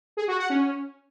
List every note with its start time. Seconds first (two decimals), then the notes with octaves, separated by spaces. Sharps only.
0.17 G#4
0.28 F#4
0.39 F#5
0.50 C#4